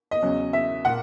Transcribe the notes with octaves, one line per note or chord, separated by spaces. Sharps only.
D#5
E2 C#3 F#3 C#4
E5
A#2 A#3 F#5